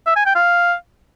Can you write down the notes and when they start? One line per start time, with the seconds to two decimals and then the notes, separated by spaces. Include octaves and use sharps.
0.06 E5
0.16 G#5
0.26 G5
0.35 F5